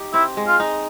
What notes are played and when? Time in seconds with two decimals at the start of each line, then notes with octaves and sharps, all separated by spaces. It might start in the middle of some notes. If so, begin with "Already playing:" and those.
Already playing: D#4 G4
0.14 C4 E4
0.37 G#3
0.47 F4
0.60 D#4